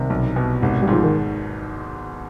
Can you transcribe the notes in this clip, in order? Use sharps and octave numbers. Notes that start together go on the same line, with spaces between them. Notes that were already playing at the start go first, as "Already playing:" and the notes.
Already playing: C2 C3 D#3
B1
B2
G#1 C3
G3
G#2 F3
D#3